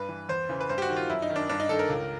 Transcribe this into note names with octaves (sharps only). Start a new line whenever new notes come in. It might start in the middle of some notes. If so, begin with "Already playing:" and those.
Already playing: G2 B4
E3
E2 C5
C#3 E3
B4
G2 C5
G4
F#4
D#3
F4
F#2 E4
D#4
D#3
D4
G2 D4
D#4
D#3 A4
A#4
C#2